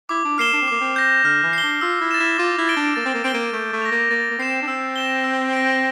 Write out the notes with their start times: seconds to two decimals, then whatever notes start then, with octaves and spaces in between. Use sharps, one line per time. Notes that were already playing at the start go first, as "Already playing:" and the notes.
0.09 E4 D6
0.25 D4
0.38 A#3 F6 C7 E7 G7
0.53 D4
0.62 C4
0.68 A#3 D6
0.81 C4
0.96 G6 A#6
1.24 D3 F6
1.43 E3
1.53 C7 G7
1.63 D4
1.81 F4 E6
2.01 E4
2.11 A6 E7
2.20 E4
2.38 F4 D6
2.58 E4
2.67 A6 D7 G7
2.77 D4
2.96 A#3 A6
3.05 C4
3.14 A#3
3.24 C4 D7 G7
3.34 A#3
3.53 A3 G6
3.72 A3
3.82 A#6 F7
3.92 A#3
4.10 A#3 A6
4.31 A#3
4.39 C4 C7 E7
4.62 D4
4.68 C4 E6
4.96 A#6 E7 G7
5.24 E6
5.53 A#6 D7